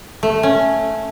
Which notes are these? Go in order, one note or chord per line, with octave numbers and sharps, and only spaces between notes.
A3
C#4